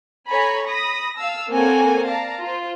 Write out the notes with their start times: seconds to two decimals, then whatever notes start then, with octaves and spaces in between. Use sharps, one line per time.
0.28 A4 C#5 G#5 A#5 B5
0.67 B5 D#6 A#6
1.18 F5 A5 E6
1.51 A#3 C4 A4 C#5 F#5 G#5
2.05 D5 F5 A5 A#5
2.40 F4 C5